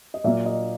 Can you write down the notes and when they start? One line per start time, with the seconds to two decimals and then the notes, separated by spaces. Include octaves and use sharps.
0.14 D#5
0.24 A#2 F#3 A#3 E5
0.46 D#5